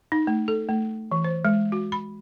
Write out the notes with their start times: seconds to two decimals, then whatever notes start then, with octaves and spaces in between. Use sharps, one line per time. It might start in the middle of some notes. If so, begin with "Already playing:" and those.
0.12 D#4
0.27 A3
0.48 A4
0.69 A3
1.11 E3
1.24 C5
1.45 G#3
1.72 F#4
1.92 B5